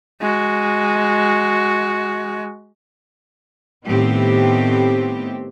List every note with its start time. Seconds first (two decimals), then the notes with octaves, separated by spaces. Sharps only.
0.21 G#3 F#4
3.86 A2 D#3 A3 B3 C4 G4